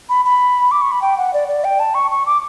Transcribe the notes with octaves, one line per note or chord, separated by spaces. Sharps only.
B5
B5
D6
C#6
B5
G5
F#5
D5
D5
G5
A5
C#6
C#6
D6